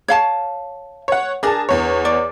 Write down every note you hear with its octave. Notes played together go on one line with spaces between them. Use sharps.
C#5 F5 A5
C#5 F#5
D4 G#4 A#4 A5
E2 C#5
D5